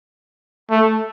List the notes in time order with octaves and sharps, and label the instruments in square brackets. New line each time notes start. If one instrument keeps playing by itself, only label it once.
[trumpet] A3